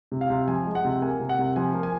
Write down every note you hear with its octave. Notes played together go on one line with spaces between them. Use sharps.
C3
F5
C3
F3 G#5
G#3
F#5
C3
A#3 G#5
C3
F#5
C3
F3 G#5
A#3
G#5